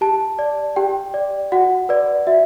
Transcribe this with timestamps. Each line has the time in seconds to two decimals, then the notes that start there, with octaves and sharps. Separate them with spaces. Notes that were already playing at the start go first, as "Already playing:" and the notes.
0.01 G4 A5
0.39 D5
0.76 G4 G5
1.14 D5
1.52 F#4 F#5
1.89 B4 D5
2.27 F#4 E5